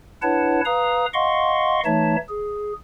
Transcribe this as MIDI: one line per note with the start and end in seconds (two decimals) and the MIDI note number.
0.22 0.61 62
0.22 0.61 64
0.22 0.61 71
0.22 0.61 73
0.22 0.61 78
0.22 0.61 81
0.65 1.06 71
0.65 1.06 77
0.65 1.06 82
0.65 1.06 87
1.14 1.80 75
1.14 1.80 77
1.14 1.80 78
1.14 1.80 84
1.14 1.80 85
1.85 2.16 52
1.85 2.16 57
1.85 2.16 63
1.85 2.16 73
1.85 2.16 76
1.85 2.16 81
2.29 2.73 68